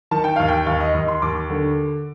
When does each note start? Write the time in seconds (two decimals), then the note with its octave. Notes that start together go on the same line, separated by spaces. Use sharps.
0.11 D#3 A5
0.24 G5
0.36 D#2 F5
0.48 G5
0.66 D#2 F5
0.80 D#5
0.94 D#2 D#5
1.08 C6
1.22 D#2 D6
1.50 D3